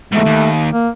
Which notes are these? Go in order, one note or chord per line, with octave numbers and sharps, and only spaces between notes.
E2 G#2 A3
D#2
A#3